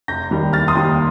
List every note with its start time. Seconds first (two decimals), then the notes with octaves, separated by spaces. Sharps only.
0.08 F1 G6 A#6
0.31 D#2 D#3 G3
0.53 F1 F6 A6
0.68 C6 D#6
0.75 D#2 D#3 G3